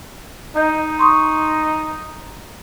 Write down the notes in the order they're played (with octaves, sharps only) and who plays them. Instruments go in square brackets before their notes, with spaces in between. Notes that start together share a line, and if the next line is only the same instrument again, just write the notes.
[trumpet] D#4 [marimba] D#5 G6
[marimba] C6 C#6 D#6